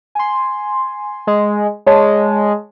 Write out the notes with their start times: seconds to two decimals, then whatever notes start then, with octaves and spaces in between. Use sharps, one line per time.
0.15 G#5 C6
1.27 G#3
1.86 G#3 C#5 A5